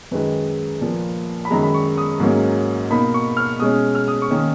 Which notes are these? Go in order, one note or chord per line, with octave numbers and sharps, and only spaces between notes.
F#2 D#3 G#3 B4
A#2 F3 A#3
B5
F#2 D#3 G#3 A#5
B5
C#6
D#6
G#2 F#3 A#3 C#4
B2 A#3 D#4 B5
C#6
F6
B2 G#3 C#4 D#6
F6
D#6
C#6
D#3 A#3 C#4 D#6